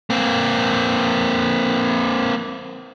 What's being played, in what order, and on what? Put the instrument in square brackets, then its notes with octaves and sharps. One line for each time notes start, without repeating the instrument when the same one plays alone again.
[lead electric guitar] A#3 C4